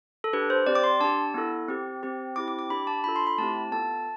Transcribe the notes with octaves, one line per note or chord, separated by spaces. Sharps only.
A4
D4 G4 B4
C5
C4 G4 D5
D6
C6
D4 G4 A5
B3 E4 A4
C4 G4
C4 G4
C4 E4 G4 D6
D6
D6
D4 G4 B5
A5
D4 F4 A4 B5
C6
B5
A3 C4 E4 G4 A5
B3 F4 A4 A5